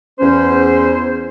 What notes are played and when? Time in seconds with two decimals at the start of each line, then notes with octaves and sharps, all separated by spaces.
0.20 E2 C#4 C5